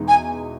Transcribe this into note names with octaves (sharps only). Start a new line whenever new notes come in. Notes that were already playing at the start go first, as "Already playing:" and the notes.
Already playing: E2 B2 G#3 D#4
G#5